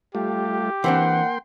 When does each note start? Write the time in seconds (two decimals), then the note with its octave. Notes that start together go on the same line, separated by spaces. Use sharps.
0.15 G3 A3 F4 G4
0.84 E3 A#3 C4 D4 F#5 G5 C6